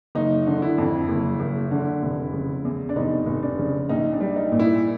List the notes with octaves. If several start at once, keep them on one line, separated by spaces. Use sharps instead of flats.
F#1 D#4
D3
E4
F2
F#1
F#1
D3
F1
C#3
E2
D4
F1 D#4
F1
D4
C#3
A#1 D#4
D4
G3
D#4
A#2
E4